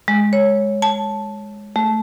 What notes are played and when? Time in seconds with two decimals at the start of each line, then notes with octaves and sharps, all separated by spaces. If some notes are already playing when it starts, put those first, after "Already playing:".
0.08 G#3
0.33 C#5
0.82 A5
1.76 A3